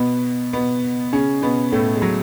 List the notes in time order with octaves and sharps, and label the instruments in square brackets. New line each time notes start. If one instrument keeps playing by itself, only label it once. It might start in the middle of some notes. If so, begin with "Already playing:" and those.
Already playing: [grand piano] B2 B3
B2 B3
C#3 C#4
B2 B3
A2 A3
G#3
F#3